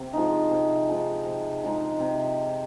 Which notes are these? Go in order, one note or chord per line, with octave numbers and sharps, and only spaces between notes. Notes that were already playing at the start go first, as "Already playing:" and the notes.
Already playing: C3
F3 G#3 D#4
C3
F3 G#3 D#4
C3
F3 G#3 D#4
C3